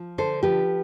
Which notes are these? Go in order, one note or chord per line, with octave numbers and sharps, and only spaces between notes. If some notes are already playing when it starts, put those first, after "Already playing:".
Already playing: F3
D3 A4 C5
F3 G4 B4